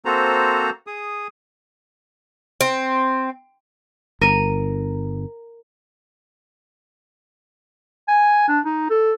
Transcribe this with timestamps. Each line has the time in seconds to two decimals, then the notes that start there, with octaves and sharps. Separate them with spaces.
0.05 A#3 C4 F#4 A4 C5 A#5
0.87 G#4 D#6
2.61 C4
4.21 G1 A#4 D#7
8.08 G#5
8.48 D4
8.65 D#4
8.90 A4